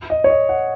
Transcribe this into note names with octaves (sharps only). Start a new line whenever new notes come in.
D#5
C#5
D#5
F#5